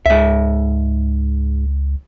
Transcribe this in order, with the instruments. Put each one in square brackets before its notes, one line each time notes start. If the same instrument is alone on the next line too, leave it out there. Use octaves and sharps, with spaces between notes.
[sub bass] C#2 [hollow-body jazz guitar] G#2 E5